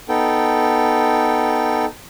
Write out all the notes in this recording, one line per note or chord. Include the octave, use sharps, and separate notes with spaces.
B3 D#4 A4 G5